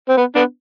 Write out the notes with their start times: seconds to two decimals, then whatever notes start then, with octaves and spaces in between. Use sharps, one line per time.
0.09 C4
0.17 B3
0.35 B3 D4